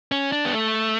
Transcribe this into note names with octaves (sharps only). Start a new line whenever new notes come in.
C#4
D4
B3
A3